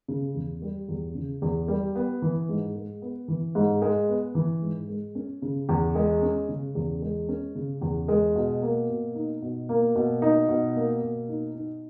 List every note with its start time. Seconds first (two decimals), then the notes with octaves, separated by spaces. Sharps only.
0.08 C#3
0.35 E2
0.62 G3
0.88 E2
1.15 C#3
1.42 E2
1.68 G3
1.95 B3
2.22 E3
2.49 G#2
2.75 G#3
3.02 B3
3.28 E3
3.55 G#2
3.82 G#3
4.08 B3
4.35 E3
4.62 G#2
4.89 G#3
5.15 C#4
5.42 C#3
5.69 E2
5.95 G#3
6.22 C#4
6.49 C#3
6.75 E2
7.02 G#3
7.29 C#4
7.55 C#3
7.81 E2
8.08 G#3
8.35 B2
8.62 A#3
8.89 B2
9.15 D#4
9.42 B2
9.69 A#3
9.95 B2
10.22 D#4
10.49 B2
10.76 A#3
11.02 B2
11.29 D#4
11.55 D#4